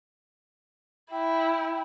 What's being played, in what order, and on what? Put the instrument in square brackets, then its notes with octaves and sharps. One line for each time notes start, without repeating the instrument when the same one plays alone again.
[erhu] E4 [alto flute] G5